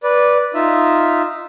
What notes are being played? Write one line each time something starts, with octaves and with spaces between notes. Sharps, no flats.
B4 D5
D#4 F4 E5